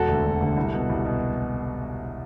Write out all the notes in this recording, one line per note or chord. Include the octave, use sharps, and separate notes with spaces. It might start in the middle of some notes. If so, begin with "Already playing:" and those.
Already playing: E1 F#4 A4
D2 D3
E1
D2 D3
C2
B2
C2
B2